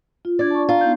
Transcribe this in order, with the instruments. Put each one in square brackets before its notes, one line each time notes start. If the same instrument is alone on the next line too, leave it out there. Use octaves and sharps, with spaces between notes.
[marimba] F4
[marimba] D4 G#6 [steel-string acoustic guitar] D5
[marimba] A5 C#6
[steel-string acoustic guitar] F4 [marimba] A#5
[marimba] B3 D#4 G6